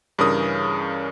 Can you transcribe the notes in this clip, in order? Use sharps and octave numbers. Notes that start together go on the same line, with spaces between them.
G2 C#3 E3 A#4 D#6